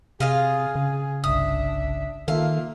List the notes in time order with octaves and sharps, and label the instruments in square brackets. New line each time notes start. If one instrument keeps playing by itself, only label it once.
[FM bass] C3 [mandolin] F4 D#5 F5 [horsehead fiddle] G#4
[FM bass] C#3
[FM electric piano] G1 C2 [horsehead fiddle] D4 E5 [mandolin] D#6
[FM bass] D#3 [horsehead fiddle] A#3 F4 [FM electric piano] A4 E5 [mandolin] F5